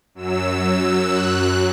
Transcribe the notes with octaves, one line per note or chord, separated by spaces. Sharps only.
F#2 F#3 E6
F#6